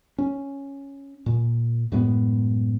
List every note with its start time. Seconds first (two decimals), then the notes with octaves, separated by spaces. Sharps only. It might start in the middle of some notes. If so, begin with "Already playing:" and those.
0.18 C#4
1.26 A#2
1.92 F#2 A2 G#3 B3